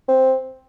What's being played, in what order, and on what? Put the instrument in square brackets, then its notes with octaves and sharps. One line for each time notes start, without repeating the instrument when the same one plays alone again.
[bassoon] C4